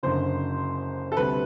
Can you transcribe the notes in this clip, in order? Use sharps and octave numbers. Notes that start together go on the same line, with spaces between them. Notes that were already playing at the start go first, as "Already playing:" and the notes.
F#1 F#2 D3 C5
A4
D2 C3 G3 B4